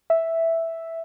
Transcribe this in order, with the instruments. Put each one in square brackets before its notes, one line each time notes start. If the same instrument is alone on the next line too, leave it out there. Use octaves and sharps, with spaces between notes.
[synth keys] E5